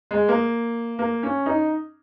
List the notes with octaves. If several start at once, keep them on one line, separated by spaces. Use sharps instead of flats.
G#3
A#3
A#3
C#4
D#4